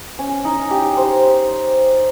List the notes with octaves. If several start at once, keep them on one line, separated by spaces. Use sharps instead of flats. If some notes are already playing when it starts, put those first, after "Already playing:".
C#4
D#4
G4
C5